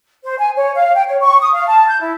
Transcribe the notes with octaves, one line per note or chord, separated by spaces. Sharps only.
C5
G#5
C#5
F5
G5
C#5
C#6
D#6
F5
A5
G6
E4